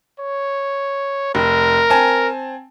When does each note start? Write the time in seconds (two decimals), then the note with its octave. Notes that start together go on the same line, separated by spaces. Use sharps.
0.20 C#5
1.35 F1 A#4
1.90 C4 G#5 A5